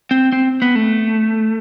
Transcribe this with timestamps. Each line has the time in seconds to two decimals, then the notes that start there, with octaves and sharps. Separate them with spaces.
0.11 C4
0.32 C4
0.62 B3
0.75 A3